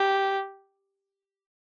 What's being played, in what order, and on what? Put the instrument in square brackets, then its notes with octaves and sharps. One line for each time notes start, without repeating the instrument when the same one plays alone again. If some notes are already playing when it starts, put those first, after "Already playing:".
Already playing: [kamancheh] G4